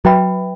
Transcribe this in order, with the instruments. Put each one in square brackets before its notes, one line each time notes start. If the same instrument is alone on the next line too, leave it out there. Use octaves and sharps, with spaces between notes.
[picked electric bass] F#3 [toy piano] B4 E5 G5 B5